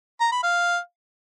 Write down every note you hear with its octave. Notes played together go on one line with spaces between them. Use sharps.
A#5
B5
F5